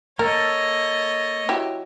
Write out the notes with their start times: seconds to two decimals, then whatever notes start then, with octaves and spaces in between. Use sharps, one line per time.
0.19 A#3 A4 A#4 C#5 D#5
1.49 F#3 E4 G4